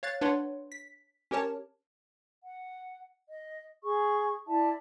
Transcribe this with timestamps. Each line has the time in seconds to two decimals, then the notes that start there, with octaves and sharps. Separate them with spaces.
0.03 C#5 F5 F#6 A6
0.21 D4 B4 C#5 F#5 C6
0.72 B6
1.31 C#4 G4 A#4 C#5 A5
2.44 F#5
3.28 D#5
3.84 G#4 C#6
4.47 E4 D5 E5 A5